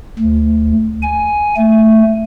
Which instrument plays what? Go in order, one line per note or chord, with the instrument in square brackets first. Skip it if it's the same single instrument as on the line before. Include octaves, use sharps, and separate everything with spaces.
[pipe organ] D2
G#5
A3